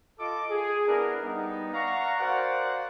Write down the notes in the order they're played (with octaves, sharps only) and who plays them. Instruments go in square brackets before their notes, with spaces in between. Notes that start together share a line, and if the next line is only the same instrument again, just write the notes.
[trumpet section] F4 A4 D#5 D6
G#4
B3 D4 E4 A#4
G3 B3 D#4
D5 F5 F#5 A#5 C#6
F#4 A#4 C5 D5 F5 F#5